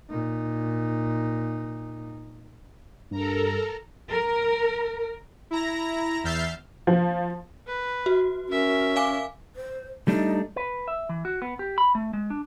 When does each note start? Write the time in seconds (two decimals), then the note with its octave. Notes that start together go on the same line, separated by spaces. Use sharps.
0.10 A#2 D#4
3.11 G2 A4 A#4 A#5
4.10 A#4
5.51 E4 A#5 A#6
6.24 E2 E5 F6 G6 A6 C7
6.87 F3
7.67 B4
8.06 F#4
8.49 C#4 A#4 E5
8.96 F5 G#5 D6
9.56 C5
10.08 G3 A3 D4 D#4
10.56 B4
10.88 E5
11.09 E3
11.25 F#4
11.42 B3
11.59 G4
11.78 B5
11.95 A3
12.13 G#3
12.30 D4